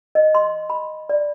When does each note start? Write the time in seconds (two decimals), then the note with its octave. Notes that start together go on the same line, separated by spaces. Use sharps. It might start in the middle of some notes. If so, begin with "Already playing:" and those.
0.15 D#5
0.35 C6
0.70 B5
1.09 D5